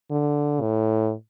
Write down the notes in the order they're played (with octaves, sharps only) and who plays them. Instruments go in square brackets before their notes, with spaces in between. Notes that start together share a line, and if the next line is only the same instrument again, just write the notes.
[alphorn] D3
A2